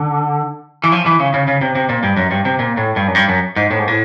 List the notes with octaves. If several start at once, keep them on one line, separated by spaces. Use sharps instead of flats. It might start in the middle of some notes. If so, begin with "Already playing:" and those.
Already playing: D3
E3
F3
E3
C#3
C#3
C#3
C3
C3
A#2
G2
F#2
G2
C3
A#2
A2
G2
F#2
G2
F#2
G#2
A2
G#2
A2